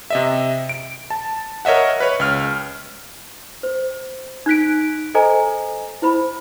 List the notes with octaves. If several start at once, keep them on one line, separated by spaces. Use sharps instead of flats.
C3 D#5 E5
D7
A5
A#4 C#5 D#5 E5 F#5
B4 C#5
C#2 F6
C5
D#4 F#6 B6 D7
A4 C5 D#5 G#5 A#5
E4 C5 B5